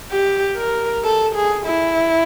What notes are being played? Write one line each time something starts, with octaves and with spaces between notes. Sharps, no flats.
G4
A#4
A4
G#4
E4